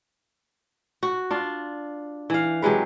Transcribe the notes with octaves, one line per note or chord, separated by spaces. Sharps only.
F#4
D4 F4
E3 F5
C3 F#3 G#3 B4